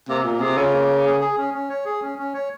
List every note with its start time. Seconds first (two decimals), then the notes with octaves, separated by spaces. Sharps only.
0.09 C3 A#3
0.24 A#2 A#3
0.40 C3 G#4
0.56 C#3 F4
0.73 A#3
0.89 A#3
1.05 G#4
1.21 G#4
1.38 C#4
1.54 C#4
1.69 C#5
1.85 G#4
2.02 C#4
2.18 C#4
2.34 C#5